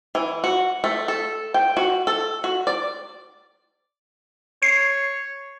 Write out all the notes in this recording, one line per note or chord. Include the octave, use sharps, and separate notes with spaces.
E3
F#4
A3
A4
G5
F#4
A4
F#4
D5
C#5 C7